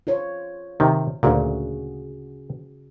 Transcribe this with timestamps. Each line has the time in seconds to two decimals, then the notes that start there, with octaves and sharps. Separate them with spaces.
0.07 F4 C5 C#5
0.80 C3 D#3
1.23 D2 A#2 C#3 F#4 G#4